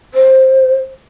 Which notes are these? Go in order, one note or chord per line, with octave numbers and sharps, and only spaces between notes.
C5